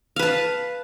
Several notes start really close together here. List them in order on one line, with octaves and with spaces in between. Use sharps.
F5 B4 A5